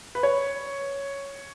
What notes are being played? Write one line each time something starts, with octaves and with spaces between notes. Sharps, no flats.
B4
C#5